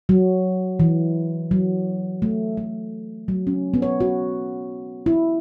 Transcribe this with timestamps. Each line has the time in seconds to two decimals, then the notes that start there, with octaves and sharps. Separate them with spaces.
0.09 F#3
0.80 E3
1.51 F#3
2.22 A3
2.57 A3
3.28 F#3
3.47 C#4
3.74 B3
3.82 C#5
4.00 F#4
5.06 E4